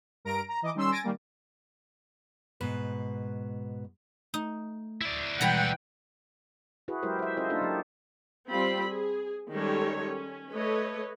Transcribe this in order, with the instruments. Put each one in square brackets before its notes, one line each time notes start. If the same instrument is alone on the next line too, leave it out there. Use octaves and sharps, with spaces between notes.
[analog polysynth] G2 A#4 A#5 A#6 D7
A#5
E3 D#5 D6
D#3 G3 C#4 C6 E6
G#5 A6 A#6 D7
D#3 G3 A#3
[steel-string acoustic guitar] G#2 B2 B4
[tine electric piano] A3 [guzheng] D#4
[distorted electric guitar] E4 D5
[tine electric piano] B2 G3 G#3 [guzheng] E3 A#5 B5 [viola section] F#5 G5
[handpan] E4 F#4 G#4 B4
F#3 G#3 E4 G4 A#4 C5
C5 E5
C#4 F4 A4 C5 D#5
A#3 D4 D#4 F4 A4
F#3 A#3 G4
[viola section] G3 C4 F4 B5
G#4
D#3 G3 G#3 C#4 A4 C#5
C#4
A3 B4 C#5 D#5